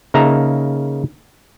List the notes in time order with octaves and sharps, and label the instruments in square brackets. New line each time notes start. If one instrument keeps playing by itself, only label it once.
[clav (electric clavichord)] C#3 A#3 D#4 E5 A5 A#5